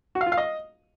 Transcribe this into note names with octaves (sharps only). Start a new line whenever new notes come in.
F#4
F5
F4
F5
D#5